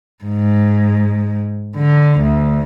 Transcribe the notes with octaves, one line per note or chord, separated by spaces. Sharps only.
G#2
D3
D2